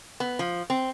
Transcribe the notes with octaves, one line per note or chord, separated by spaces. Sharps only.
B3
F3
C4